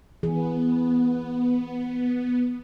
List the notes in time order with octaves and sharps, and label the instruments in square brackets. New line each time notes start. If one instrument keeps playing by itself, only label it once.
[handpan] E3 G#4 [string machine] B3